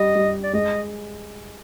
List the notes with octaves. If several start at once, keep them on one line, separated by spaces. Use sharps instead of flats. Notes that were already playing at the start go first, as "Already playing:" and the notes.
Already playing: G3 D#5
G3
D5
G#3 D#5